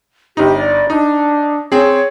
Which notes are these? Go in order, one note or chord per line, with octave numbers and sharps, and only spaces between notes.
G1 D#4 G4
D5
D4 D#4
C4 G#4 C#5